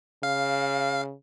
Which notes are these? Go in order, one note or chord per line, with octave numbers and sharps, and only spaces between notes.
C#3 F5